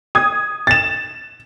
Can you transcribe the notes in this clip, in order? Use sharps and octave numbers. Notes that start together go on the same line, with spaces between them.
D#6 G#6
A6 E7